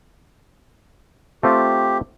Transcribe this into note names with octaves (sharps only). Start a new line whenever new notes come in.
A3 C4 F4 G4